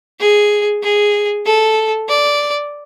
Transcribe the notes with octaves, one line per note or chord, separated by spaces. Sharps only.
G#4
G#4
A4
D5